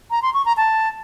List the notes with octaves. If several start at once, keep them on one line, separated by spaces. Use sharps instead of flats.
A#5
C6
C#6
A#5
A5